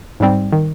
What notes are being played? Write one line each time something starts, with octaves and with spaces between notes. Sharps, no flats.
G#2 G3 C4
D#3